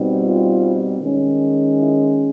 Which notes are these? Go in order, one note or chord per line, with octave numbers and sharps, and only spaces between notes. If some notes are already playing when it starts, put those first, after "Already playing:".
Already playing: B2 G3 C4 D#4
F4
D#3 G#3 C#4
E4